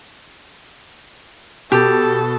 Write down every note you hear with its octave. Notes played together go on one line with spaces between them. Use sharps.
B2 G4 A4